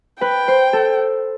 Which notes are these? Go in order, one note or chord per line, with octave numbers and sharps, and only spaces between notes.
B4 G5
C5
A4